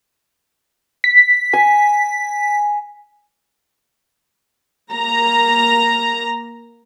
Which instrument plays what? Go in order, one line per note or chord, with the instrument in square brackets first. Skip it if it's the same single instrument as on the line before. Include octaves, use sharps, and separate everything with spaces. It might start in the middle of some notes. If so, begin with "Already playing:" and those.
[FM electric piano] B6
[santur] G#5
[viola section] A#3 A#5